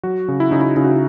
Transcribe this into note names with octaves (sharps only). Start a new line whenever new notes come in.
F#3 F#4
C#3
E4
C#3 D#4
E4
C#3 E4
F#4
E4